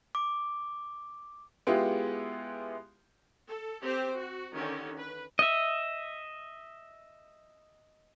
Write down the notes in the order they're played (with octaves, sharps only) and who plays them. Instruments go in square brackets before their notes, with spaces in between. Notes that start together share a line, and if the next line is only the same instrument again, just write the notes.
[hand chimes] D6
[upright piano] G#3 B3 E4 F4 G4 G#4
[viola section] A4
C4 G4 C5
F#4
D3 D#3 C#4 G4
B4
[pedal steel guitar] D#5 E5